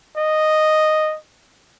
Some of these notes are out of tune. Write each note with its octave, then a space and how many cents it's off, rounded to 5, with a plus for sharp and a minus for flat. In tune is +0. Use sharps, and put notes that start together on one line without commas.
D#5 -5